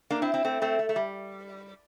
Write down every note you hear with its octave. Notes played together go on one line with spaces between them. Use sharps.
A#3 D4
C4 E4
C4 E4
A3 C4
A3 C4
A3
A3
G3